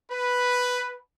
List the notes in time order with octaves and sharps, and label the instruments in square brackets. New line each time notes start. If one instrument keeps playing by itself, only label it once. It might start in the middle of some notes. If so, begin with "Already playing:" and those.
[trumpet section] B4